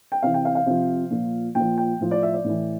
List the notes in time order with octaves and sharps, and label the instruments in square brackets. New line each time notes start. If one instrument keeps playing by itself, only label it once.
[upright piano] G5
C3 E3 F5
G5
F5
F5
C3 F3
A#2 F3
A#2 G5
F3
G5
A2 F3
D5
E5
D5
A2 E3